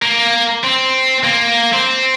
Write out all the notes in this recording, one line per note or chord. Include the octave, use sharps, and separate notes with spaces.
A#3
C4
A#3
C4